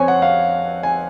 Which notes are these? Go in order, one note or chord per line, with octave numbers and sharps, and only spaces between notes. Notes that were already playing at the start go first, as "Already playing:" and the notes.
Already playing: F2 C4 C5 C#5 G#5
F#5
F5
G#5